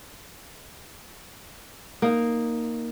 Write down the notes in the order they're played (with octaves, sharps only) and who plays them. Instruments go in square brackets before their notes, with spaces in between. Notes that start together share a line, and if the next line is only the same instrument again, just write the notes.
[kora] A#3 D#4